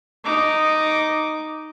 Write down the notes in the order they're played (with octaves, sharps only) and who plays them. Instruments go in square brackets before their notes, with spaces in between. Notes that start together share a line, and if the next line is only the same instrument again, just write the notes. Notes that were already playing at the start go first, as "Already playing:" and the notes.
[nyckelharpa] D#4 D6